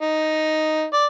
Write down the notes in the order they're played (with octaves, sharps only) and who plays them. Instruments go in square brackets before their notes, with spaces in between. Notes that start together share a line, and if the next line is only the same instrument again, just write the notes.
[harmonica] D#4
D5